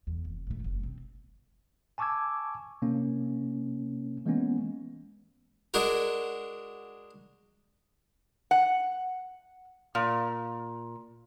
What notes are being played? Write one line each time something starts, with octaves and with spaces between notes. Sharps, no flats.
E2
F1
A#1 A3
F#1
B2 C4
G#5 A5 C#6 D6 E6 G#6
C3 A#3 C#4
E3 G#3 A#3 B3 C#4
G#3 D4 F#4 G#4 A#4
F#5
A#2